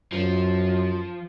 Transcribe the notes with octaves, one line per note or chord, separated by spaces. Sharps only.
F#2 F3